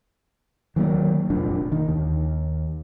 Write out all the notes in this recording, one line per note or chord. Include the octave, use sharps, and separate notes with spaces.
D#3 F#3 G#3 A#3
F1 A#2 D4
D#3
D#2